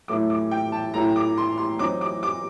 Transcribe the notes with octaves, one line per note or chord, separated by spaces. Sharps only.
A2 F#3 A3 D6
D6
G5
A5
A2 F#3 A3 A#5
D6
C6
C6
F#3 C4 D#4 D6
D6
D6